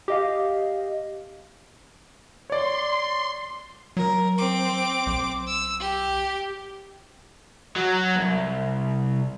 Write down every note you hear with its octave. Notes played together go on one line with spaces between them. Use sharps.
G4 D#5 F5
C#5 D5 C6
F#3 A#4
C4 D6
B1
E6
G4
F#3
C2